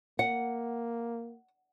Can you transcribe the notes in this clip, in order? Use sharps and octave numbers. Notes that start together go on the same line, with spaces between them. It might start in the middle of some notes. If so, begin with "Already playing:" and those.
A#3 F#5